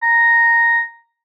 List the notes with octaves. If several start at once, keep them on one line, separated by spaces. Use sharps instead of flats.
A#5